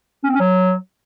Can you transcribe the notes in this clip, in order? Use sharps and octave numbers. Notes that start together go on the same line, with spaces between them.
C#4
C4
C#4
F#3